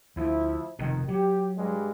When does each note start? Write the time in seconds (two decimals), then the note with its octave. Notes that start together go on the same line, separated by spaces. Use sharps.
0.16 D2 F3 E4
0.79 F1 F2 B2 D#3
1.09 F#3 G4
1.56 G2 G3 G#3